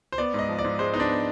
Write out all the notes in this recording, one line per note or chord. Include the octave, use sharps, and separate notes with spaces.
C5
B3 D5
G#2 D#5
F3
D5
G#2
G#3 C5
B3 D#4
D4
B3